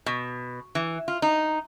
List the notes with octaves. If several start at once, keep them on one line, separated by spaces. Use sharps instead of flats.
B2
E3
F4
D#4